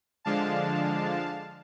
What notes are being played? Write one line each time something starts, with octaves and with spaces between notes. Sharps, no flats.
D3 F3 G#3 D4 F5 A5